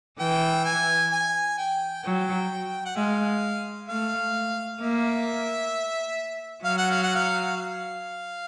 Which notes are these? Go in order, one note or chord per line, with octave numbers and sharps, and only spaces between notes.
E3 G5
G#5
G#5
G5
F#3 G5
F#5
G#3 F5
A3 F5
A#3 E5
F#3 F5
F#5
F5
F#5
F5
F5